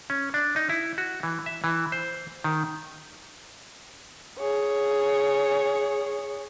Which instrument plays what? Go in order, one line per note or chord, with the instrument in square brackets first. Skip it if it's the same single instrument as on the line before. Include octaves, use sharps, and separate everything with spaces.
[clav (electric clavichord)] C#4
D4
D#4
E4
F#4
E3
E5
E3
C5
D#3
[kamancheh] G#4 C#5